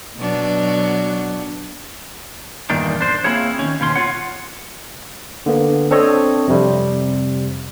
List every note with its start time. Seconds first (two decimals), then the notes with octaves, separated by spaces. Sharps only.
0.17 B2 F#3 D4
2.70 E2 G2 A#2 D#3 D4
3.01 D4 C5
3.24 A#3 C4 E4 F4 G#4 C#5
3.59 D#3 C#4
3.80 D#2 B2 C#4 C6
3.96 F4 C#5 F#5
5.46 D3 A#3 B3
5.91 C4 D4 A4 C5 C#5 D#5
6.48 F2 C3 G3